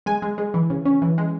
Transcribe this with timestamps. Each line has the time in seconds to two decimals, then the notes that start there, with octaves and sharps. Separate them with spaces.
0.06 G#3 G#5
0.22 G#3
0.38 G#3
0.54 E3
0.70 C#3
0.85 C#4
1.02 E3
1.18 G#3